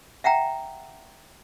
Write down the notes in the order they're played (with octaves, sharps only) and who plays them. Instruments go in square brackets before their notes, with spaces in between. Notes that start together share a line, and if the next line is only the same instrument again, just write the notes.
[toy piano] E5 F#5 G5 A#5